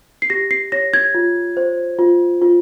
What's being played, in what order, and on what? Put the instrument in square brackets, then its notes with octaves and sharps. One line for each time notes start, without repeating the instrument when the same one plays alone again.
[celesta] C7
G4 A#6
C7
C#5 A#6
G#6
F4
C5
F4
F4